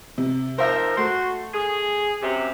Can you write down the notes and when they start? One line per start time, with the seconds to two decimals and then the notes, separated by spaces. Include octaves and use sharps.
0.18 C3
0.58 F3 D#4 A#4 C5 E5
0.97 A3 F#4 C6
1.54 G#4
2.21 F#2 C3